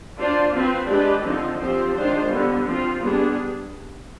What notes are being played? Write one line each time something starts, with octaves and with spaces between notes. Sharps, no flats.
D4 F4 C5
F3 C4 F4 B4
G#3 D4 G4 B4 D#5
D3 F3 C4 D#4
F3 C4 G4 C5
D#3 G#3 D4 F4 C5
D3 G3 B3
F3 C4 F4
G3 B3 D4 G#4